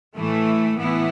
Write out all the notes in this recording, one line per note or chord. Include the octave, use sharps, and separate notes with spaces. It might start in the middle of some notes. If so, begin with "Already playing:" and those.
A2 E3 A3
A2 E3 B3 E4